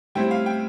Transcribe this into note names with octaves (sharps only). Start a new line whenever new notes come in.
A2 G3 C4 E4 G5
F5
G5